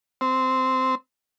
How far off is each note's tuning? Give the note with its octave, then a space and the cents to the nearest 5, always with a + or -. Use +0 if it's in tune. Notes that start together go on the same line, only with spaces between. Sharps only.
C4 -10